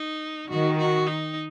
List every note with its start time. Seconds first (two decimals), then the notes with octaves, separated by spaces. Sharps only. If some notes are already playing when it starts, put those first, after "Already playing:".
Already playing: D#4
0.50 D#3 F#4
0.78 F#4
1.07 D#4